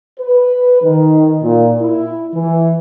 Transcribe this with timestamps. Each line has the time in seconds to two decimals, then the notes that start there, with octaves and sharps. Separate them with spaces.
0.19 B4
0.82 D#3
1.42 A#2
1.80 E4
2.34 E3